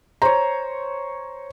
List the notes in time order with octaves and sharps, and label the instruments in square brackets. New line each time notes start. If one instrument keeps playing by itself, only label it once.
[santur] C5 C#5 [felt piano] A#5